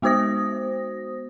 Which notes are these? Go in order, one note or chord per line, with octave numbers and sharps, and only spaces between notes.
G#3 B3 F#4 C5 D#6 A#6